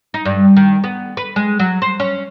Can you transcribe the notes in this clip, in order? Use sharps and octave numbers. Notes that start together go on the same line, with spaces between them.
D#4
G2
D#3
B3
B4
G#3
F#3
C5
C#4